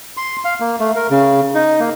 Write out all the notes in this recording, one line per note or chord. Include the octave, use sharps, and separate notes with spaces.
C6
F5
A#3
A3
A#4
C#3
D#4
A#3